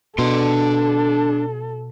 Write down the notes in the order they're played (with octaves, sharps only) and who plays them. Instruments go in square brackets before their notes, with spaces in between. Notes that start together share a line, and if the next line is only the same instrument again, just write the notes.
[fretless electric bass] B2 [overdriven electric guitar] D4 C6 [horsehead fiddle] A4